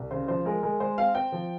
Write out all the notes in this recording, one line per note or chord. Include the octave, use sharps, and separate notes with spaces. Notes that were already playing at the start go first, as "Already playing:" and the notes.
Already playing: C2
C#3 C5
F3 C5
G#3 A#4
G#3 A#4
G#3 C5
C4 F5
C4 G5
F3